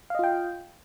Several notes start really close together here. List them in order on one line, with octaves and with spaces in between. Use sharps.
F5 D#5 F4 G5